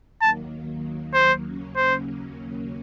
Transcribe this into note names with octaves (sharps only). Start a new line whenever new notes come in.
D#2 D#3 F#3 A#3 A5
C5
D#2 C#3 F#3 A#3 C#4
C5